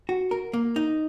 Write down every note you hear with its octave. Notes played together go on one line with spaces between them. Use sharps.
F#4
A#4
A#3
D#4